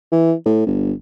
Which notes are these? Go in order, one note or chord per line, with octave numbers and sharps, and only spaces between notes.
E3
A2
G1